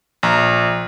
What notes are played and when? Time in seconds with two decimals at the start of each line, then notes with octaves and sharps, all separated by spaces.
0.23 A#1 A#5